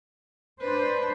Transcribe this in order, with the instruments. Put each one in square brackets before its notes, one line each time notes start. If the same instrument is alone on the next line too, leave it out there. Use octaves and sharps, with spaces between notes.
[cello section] D4 C5 [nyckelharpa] B4